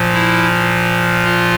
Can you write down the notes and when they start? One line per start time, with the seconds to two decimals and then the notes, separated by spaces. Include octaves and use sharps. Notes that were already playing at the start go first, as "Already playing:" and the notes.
Already playing: A#2 F3
0.13 E4
1.24 F4